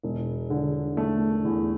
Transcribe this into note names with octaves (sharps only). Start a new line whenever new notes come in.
E1
D3
A3
E2